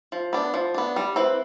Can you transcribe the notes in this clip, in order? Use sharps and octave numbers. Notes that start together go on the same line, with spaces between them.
F3
B3 D4
F3
B3 D4
G3
C4 E4 B4